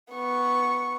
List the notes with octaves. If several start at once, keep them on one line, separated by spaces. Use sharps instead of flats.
B3 C#6